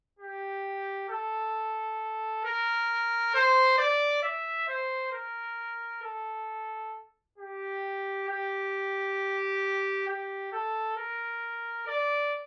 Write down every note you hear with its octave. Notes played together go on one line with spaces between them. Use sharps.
G4
A4
A#4
C5
D5
E5
C5
A#4
A4
G4
G4
G4
A4
A#4
D5